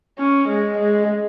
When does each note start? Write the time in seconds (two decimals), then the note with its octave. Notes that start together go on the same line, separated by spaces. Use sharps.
0.19 C#4
0.48 G#3
0.78 G#3